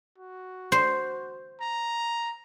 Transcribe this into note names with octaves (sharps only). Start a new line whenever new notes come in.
F#4
C5
A#5